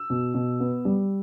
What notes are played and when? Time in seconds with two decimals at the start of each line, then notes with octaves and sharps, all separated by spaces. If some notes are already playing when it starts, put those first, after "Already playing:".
Already playing: E6
0.10 B2
0.34 B2
0.60 B3
0.85 G3